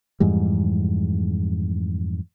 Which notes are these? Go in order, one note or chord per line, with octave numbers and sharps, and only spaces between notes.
F2 G#2 E3 G3